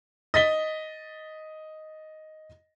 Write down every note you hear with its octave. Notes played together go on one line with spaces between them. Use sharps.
D#5 A6 B6 G7